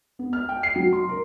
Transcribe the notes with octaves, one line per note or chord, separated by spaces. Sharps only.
B3
F6
G5
C7
F#3
C6
A#4